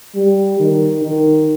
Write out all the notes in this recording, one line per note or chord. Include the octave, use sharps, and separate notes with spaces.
G3
D#3
D#3